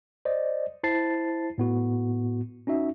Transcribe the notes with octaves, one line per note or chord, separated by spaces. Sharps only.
C5 D5 D#5
E4 C5 A5 A6 C7
A2 B3 F#4
C#4 D#4 F#4 E5